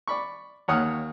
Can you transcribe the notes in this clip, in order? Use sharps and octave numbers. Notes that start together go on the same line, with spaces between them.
D5 B5 C#6
D#2 C#5 F#5 D#6 F6